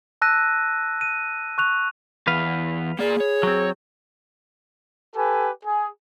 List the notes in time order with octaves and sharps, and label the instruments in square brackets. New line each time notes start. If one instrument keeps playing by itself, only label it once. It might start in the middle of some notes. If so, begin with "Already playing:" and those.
[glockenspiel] A5 E6 F#6 A#6 D#7
D#7
C#6 F#6 F7
[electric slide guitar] E2 [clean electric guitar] B4 F5
[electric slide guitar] A#3 D5 [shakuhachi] G#4
[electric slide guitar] C#5
[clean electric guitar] F#3 C4
[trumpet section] G4 A4 B4 G#5
G#4